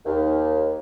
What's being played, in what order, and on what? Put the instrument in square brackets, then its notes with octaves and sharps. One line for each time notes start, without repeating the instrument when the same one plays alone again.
[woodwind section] D#2